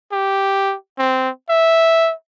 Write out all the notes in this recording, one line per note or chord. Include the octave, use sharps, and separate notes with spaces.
G4
C4
E5